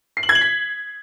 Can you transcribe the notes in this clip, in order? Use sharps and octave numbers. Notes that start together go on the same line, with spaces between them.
C7
F#7
G#6
F#7
B6